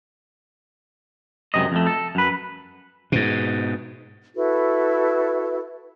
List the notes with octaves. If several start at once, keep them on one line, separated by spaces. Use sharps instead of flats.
C#2 F#2 C3 D#5
F2 A3
A4
F#2 B4
G#2 B2
E4 F#4 A4 B4